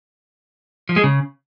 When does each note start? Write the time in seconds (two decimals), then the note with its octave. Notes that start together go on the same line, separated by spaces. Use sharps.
0.89 F3
0.96 G#3
1.04 C#3